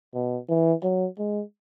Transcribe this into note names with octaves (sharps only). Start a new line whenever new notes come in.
B2
E3
F#3
G#3